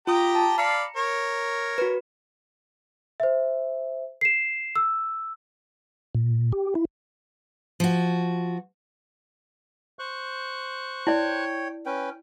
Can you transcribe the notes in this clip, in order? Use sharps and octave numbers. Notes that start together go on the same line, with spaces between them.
F4 G4 G5 A#5 D#6
A5
D5 F5 A#5 B5 C#7
A#4 C#5
F#4 B4
C5 E5
C7 E7
E6
A#2
G4
E4
F3 F#4
C5 C#6 F#6
E4 C#5 D5 G5
C#4 B4 G5